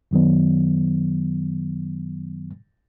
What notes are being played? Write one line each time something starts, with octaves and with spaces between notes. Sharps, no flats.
F#2 D#3 F#3 B3